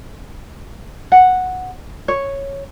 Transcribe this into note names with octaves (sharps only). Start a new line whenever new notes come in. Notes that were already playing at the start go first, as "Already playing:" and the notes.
F#5
C#5